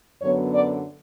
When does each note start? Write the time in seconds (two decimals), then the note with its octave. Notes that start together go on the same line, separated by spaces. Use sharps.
0.21 F#2 D3 F#3 B3 C#5
0.53 D5